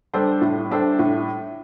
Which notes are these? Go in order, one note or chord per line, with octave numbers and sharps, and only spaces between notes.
G3 D4 A4 C5
A2
G3 D4 A4 C5
A2